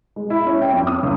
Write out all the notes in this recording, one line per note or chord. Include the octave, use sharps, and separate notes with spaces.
G#3
E4
C#4
G5
F2
D#6
C#2